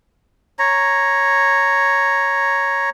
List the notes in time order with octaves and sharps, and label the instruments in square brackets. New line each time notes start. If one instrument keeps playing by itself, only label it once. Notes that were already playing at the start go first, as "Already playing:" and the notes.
[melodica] C#5 A#5